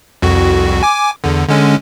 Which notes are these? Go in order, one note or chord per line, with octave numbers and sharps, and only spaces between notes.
C2 F2 F#4
G#5 D6
E2 D3
D3 G#3 C#4